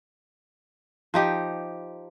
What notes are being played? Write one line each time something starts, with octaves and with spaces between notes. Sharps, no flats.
F3 D#4 G4